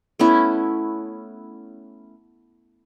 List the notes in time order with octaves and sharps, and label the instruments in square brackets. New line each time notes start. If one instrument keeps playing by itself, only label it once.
[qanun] A3 B3 C#4 E4